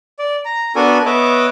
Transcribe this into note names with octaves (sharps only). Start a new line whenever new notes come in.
D5
A#5
B3 D4 F#4 A4 A#4 G#5
B3 B4 C#5 D#5 E5 D6